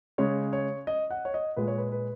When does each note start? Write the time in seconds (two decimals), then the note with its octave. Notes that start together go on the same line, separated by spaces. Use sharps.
0.18 C#3 G#3 C#5
0.53 C#5
0.87 D#5
1.11 F#5
1.25 C#5
1.34 D#5
1.57 A#2 G#3 B4
1.68 C#5
1.78 B4
1.92 B4